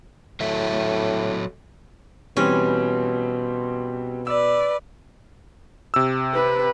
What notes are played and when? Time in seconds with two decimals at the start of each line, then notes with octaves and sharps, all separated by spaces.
0.41 A2 F#3 A4 E5
2.37 B2 E3 G3 C4 C#4
4.27 B4 D5 E6
5.94 C3 E6
6.34 B4